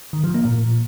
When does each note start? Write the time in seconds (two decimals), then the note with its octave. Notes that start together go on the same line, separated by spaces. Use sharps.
0.13 D#3
0.24 F3
0.34 A#3
0.45 A#2